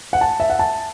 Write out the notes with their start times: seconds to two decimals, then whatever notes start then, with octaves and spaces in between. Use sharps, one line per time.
0.13 F#5
0.21 A5
0.40 E5
0.50 F#5
0.59 A5